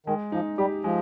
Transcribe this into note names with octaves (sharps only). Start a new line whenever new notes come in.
D#3 G#3
F3 D#4
G3 G4
F3 G#3